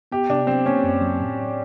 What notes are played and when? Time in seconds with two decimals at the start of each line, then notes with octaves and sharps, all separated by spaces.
0.12 B3 G4
0.30 C3 D4
0.47 F#3 C4
0.65 A#3 C#4
0.84 F#2
1.01 F#3
1.20 A2
1.38 A2